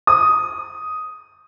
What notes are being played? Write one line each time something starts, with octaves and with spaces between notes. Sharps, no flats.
D#6